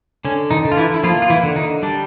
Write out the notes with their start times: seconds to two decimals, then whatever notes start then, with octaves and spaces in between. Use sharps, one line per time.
0.25 D3 C#4
0.51 D#3 D#4
0.65 D3
0.72 F4
0.77 E3 E4
0.94 E4
1.03 F3 A#3 F4
1.22 F4
1.29 E3 E4
1.43 D3
1.56 D#3 D#4
1.83 G3 D4